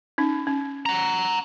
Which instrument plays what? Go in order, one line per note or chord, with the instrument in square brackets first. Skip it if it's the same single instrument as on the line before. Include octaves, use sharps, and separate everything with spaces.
[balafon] C#4 D#4
C#4
[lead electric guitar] F#5 A#5